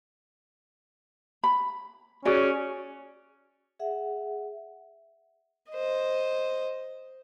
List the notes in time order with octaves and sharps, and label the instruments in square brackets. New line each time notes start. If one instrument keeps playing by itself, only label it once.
[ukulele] B5
[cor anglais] C#4 [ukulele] F#4 G#4 D5
[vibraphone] G#4 E5 F#5
[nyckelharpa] C5 D#5